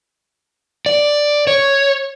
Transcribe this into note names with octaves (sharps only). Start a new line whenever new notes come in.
D5
C#5